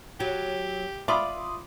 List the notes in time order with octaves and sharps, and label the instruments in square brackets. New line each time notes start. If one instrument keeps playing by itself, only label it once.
[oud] F#3 [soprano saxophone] G4
[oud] F4 [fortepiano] D5 B5 D6 [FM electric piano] E5 C6 D#6